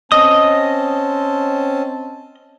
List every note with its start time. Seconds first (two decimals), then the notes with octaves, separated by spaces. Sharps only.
0.12 C4 C#4 D#5 A5 D#6